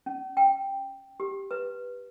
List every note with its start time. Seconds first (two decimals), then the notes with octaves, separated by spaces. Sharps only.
0.06 C#4
0.37 G5
1.20 G4
1.51 B4